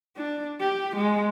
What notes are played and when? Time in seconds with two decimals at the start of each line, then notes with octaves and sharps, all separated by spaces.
0.17 D4
0.60 G4
0.96 G#3